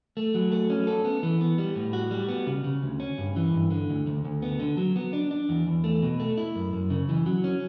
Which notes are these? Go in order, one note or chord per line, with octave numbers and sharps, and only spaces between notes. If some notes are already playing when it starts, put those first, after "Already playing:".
A3
F#3
A3
C#4
A4
B3
E3
B3
G3
A2
F#4
G3
B3
C#3
C#3
D2
C#4
G2
E3
G2
D3
D2
D2
D2
B3
D3
F#3
B3
D4
D4
E2
E2
A3
B2
A3
E4
F#2
F#2
C#3
E3
F#3
C#4